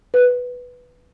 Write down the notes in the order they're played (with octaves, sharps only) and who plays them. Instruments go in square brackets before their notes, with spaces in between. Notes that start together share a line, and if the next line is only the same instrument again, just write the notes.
[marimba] B4